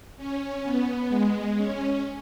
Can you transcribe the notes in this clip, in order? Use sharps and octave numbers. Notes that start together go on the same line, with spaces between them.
C#4
B3
G#3
C#4